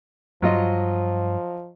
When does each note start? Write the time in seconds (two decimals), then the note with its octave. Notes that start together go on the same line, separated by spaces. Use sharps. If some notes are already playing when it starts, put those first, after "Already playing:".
0.42 G2 F3 F#3 F4 D#5